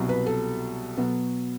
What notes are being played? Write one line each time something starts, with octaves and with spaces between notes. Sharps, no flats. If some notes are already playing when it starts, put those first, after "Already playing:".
Already playing: C2 B2 F#3
B4
A4
B2 F#3 B3